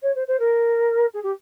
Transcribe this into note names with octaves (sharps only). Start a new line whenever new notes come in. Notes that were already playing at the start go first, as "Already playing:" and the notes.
C#5
C5
C5
A#4
G#4
G4